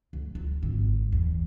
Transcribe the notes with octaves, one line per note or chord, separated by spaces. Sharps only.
D2
F4
G#1 D3
E2